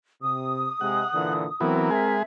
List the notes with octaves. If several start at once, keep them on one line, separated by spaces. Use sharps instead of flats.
C3 D#6
C3 G#3 F#5
A#2 D3 E3
E3 F#3 B3 C4 A#4
G#3 G#4 E5